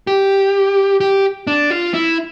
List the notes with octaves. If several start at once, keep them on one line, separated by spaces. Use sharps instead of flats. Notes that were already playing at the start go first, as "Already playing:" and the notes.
G4
G4
D4
F4
E4